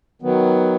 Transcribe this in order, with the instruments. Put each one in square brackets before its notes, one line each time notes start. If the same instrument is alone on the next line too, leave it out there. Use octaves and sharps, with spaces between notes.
[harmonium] D#3 F#3 B3